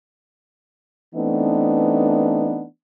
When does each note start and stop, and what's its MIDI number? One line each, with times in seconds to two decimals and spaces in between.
1.15 2.64 52
1.15 2.64 57
1.15 2.64 59
1.15 2.64 60
1.15 2.64 62
1.15 2.64 63